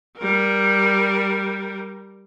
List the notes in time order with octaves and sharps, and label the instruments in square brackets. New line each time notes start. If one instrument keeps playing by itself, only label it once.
[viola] G3 A#4